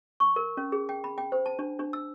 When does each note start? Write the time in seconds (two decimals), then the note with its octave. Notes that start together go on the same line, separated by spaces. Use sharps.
0.20 C#6
0.36 A#4
0.57 C#4
0.72 G#4
0.89 G5
1.04 B5
1.18 G5
1.32 C5
1.46 A5
1.59 D4
1.79 D4
1.93 E6